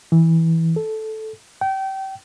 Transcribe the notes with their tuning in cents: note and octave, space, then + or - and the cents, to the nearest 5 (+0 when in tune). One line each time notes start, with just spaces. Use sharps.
E3 -10
A4 -10
G5 -25